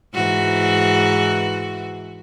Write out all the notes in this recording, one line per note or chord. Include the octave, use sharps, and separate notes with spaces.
G#2 E3 F#4